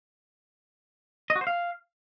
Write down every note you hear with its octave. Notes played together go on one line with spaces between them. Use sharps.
D#5
F#4
C5
F5